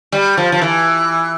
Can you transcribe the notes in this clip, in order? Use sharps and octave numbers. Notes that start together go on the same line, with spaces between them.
G3
F3
F3
E3